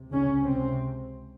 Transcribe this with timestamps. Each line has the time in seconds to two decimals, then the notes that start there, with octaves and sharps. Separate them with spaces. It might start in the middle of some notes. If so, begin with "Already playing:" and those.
Already playing: C#2 C3
0.11 C#3 C#4
0.44 C3 C4